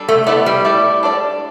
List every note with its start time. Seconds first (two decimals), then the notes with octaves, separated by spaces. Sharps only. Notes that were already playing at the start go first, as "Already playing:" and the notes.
Already playing: G3 D4 A4
0.08 A3
0.27 A3 B3 E4 B4 D5
0.46 G3
0.65 A3 E4 G4 D5
1.03 D4 A4 D5